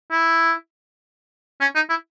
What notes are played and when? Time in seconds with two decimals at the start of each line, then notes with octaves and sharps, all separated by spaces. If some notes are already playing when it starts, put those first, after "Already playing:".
0.12 E4
1.61 C#4
1.76 D#4
1.90 E4